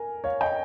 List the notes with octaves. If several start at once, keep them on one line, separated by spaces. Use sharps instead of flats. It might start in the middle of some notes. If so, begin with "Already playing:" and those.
Already playing: A#4 G#5
C#5 F5
D#5 G5